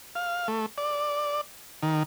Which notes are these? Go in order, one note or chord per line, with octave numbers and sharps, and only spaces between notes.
F5
A3
D5
D#3